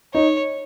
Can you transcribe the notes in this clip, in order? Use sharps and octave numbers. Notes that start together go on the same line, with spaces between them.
D#4 C#5